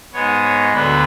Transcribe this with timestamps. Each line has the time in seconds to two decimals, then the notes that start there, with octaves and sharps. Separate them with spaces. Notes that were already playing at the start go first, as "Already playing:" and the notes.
0.13 G#2 G#3 B3 C#5
0.44 C#5
0.73 D2 D3 F#3 B3 D4 B4